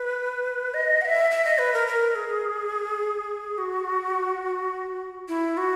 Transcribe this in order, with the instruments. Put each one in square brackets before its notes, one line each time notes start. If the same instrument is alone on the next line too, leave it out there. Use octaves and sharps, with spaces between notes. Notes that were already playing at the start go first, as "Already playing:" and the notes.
Already playing: [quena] B4
D#5
F#5
E5
E5
D#5
B4
A#4
A#4
G#4
F#4
E4
F#4